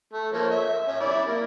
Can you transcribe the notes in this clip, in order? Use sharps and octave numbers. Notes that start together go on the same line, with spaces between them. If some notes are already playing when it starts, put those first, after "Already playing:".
A3
F3 A#3 C#5
E5
C#4 E5
E4 D5
A#3